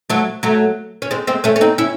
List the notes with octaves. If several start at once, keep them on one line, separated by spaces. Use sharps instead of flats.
F#3 A3
F#3 A3
C#4
G#3 C4
G#3 C4
A3 C#4
C#4
C4 D#4
C#4 E4